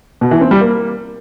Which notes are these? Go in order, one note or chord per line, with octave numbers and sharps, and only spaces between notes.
B2
E3
C4
G3
A#3